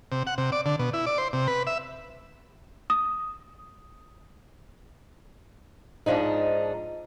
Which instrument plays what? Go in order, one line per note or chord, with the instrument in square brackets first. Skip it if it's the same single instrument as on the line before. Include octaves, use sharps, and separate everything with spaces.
[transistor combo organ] C3
F#5
C3
D5
D3
B2
E4
D5
C5
C3
B4
E5
[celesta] D#6
[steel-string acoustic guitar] G#2 B2 F3 D4 D#4